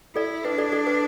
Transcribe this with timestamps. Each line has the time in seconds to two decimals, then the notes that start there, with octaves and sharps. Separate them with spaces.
0.16 E4 A4 D5
0.44 D4 B4
0.58 A4 D5
0.72 A4 D5
0.87 B4